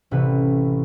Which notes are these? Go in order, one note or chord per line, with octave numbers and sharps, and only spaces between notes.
A1 C3 C#4 B4